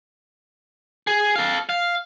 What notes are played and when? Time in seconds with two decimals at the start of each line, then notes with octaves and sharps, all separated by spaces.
1.07 G#4
1.36 A4 F5
1.69 F5